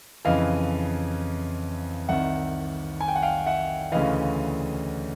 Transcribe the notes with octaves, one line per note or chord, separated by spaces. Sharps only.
F2 C#3 E3 D#5 F5
C2 C3 D#3 E5 F#5
G#5
G5
F#5
F5 G5
E5 F#5
D2 C#3 E3 D#5 F5